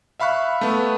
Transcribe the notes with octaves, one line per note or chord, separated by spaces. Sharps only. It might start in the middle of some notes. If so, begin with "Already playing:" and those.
E5 F5 B5 C#6 F#6
A3 B3